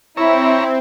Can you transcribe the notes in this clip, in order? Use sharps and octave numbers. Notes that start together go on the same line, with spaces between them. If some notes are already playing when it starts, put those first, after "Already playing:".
C4 E4 C#5 E5 A#5